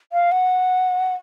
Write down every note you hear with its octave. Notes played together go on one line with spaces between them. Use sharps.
F5
F#5